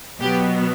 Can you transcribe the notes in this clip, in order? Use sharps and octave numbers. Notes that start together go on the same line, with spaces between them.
B2 F#3 B3 G4